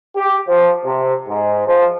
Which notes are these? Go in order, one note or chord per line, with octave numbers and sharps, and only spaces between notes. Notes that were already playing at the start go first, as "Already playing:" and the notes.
G4
F3
C3
G#2
F3